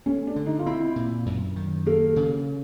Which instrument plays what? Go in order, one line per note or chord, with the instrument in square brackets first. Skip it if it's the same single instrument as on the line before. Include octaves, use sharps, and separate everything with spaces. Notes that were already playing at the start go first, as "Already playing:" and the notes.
[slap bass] A3 [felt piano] C#4
[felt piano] D4
[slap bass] D3
[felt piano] D#4
F4
[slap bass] C4 [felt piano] E4
[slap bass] A#2
F#2
D#3
[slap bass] A#3 [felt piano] A4
[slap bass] C#3